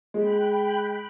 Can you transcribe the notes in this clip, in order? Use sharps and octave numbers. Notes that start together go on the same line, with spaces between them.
G#3 G5 B5 F#6